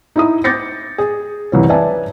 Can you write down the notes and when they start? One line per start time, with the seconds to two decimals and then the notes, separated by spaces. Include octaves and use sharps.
0.16 D#4 E4 D#6
0.44 D6 G6 A6 A#6 C#7
0.98 G#4
1.52 F#1 C2 E3 C#5
1.69 B4 D5 E5 G#5 A5